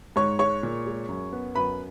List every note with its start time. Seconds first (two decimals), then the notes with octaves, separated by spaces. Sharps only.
0.16 G#2 C#5 C#6
0.39 G#3 C#5 C#6
0.63 A#2
0.86 G#3
1.08 F#2
1.33 B3
1.55 F#2 B4 B5